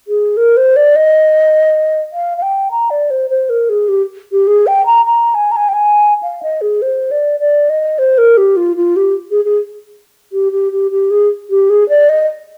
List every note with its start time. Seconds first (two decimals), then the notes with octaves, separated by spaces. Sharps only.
0.08 G#4
0.37 A#4
0.57 C5
0.76 D5
0.96 D#5
2.13 F5
2.38 F5
2.42 G5
2.71 A#5
2.90 D5
3.10 C5
3.30 C5
3.50 A#4
3.69 G#4
3.88 G4
4.32 G4
4.47 G#4
4.67 G5
4.86 A#5
5.05 A#5
5.35 G#5
5.52 A#5
5.56 G#5
5.69 G5
5.73 G#5
6.23 F5
6.43 D#5
6.61 G#4
6.82 C5
7.11 D5
7.40 D5
7.70 D#5
7.99 C5
8.18 A#4
8.37 G4
8.57 F4
8.77 F4
8.96 G4
9.31 G#4
9.45 G#4
10.32 G4
10.52 G4
10.72 G4
10.91 G4
11.11 G#4
11.50 G4
11.70 G#4
11.89 D5
12.09 D#5